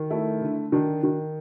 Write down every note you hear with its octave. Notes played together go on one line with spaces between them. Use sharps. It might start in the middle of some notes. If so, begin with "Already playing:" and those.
Already playing: D#3
A3 E4
D3
D#3 D4
D#3